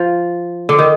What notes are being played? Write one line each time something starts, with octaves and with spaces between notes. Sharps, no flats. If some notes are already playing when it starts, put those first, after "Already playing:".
Already playing: F3
D3
D#3